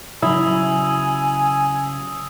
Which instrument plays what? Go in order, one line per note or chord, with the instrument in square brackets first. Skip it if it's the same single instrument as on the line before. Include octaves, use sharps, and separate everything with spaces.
[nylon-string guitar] C#3 F#3 [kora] E4 [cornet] G#5 [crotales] D#6 E6